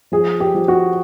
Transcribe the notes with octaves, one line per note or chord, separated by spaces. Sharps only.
F3 G#4
G4
F3
F#4